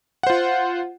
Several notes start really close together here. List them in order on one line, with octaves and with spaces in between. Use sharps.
F#5 C5 F4